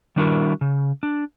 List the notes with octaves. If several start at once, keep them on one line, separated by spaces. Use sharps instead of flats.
D#3 G3 D4 E4 F#4 A#4
C#3
D4